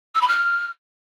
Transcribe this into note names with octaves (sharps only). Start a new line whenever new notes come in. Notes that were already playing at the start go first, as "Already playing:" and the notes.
E6
B5
F6